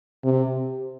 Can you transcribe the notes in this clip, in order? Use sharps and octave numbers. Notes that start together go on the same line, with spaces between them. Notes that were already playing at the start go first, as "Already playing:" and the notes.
C3